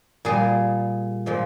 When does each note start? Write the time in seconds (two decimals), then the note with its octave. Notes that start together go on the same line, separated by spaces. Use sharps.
0.25 A#2 G3 G#4
1.26 A#2 F3 G#3